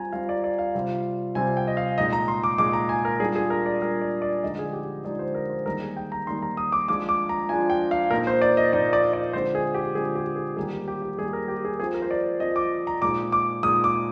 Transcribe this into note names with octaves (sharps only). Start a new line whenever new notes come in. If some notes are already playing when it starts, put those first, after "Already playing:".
Already playing: G3 C4 F4 G#5 A#5
G3 C4 F4 F5
D5
D5
F5
C3 G3 C4 F4
C3 G3 C4 F4 G#5
G5
D#5
F5
A#2 G#3 D#4 D#5
A#5
C6
D6
A#2 G#3 D#4 D6
A#5
G#5
A#4
G3 D4 F4 G#4
G#4
A#4
D5
G3 D4 F4 A#4
D5
D5
D3 F3 G#3 D#4 D#5
G#4
G4
D3 F3 G#3 D#4 D5
C5
A#4
C5
D#3 G3 A#3 D#4 A#4
G#4
G5
A#5
D#3 G3 A#3 D#4 C6
A#5
D#6
D6
F3 G#3 D4 F4 D6
D6
A#5
F3 G#3 D4 F4 G#5
G5
F5
A#2 F3 A#3 D#4 A#4
C5
D5
D#5
A#2 F3 A#3 D#4 D5
D5
D5
D3 G#3 C4 F4 C5
G#4
G4
D3 G#3 C4 F4 G#4
G4
G#4
D#3 G3 A#3 G#4
G4
G4
G4
D#3 G3 A#3 G#4
A#4
G4
G#4
F3 C4 F4 G#4
A#4
C5
D5
F3 C4 F4 D#5
D6
A#5
A#2 G#3 D#4 D6
D6
A#2 G#3 D#4 D#6
D6